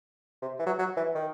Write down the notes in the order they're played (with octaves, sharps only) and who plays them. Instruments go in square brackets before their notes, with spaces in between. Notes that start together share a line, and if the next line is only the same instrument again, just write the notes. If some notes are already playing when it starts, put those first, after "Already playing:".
[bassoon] C3
E3
F#3
F#3
E3
D#3